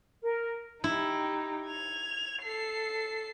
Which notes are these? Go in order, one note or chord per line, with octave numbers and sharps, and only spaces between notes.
A#4
D#4 E4 G4
G#6 F7
A4 C7